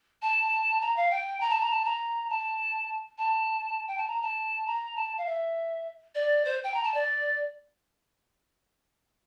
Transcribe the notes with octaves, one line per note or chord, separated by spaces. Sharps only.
A5
A#5
F5
G5
A#5
A5
A#5
A5
A#5
A5
A5
G5
A5
A#5
A5
A#5
A5
F5
E5
D5
C5
G5
A#5
A5
D5